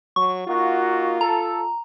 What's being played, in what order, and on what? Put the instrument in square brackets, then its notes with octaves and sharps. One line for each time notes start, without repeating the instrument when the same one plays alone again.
[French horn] F#3 [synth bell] C#6
[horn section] A#3 D#4 F#4 [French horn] F4
[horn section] A4 [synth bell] A#5